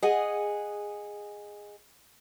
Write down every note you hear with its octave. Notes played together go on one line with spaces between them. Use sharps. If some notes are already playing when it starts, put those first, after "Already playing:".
G#4 D#5 F#5 G#5